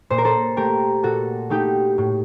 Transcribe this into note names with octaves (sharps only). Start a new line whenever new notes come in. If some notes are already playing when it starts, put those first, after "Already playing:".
A#2 C5
A#4
A4 C5
A3 G4 A#4
A#2 F#4 A4
A3 D#4 G4
A2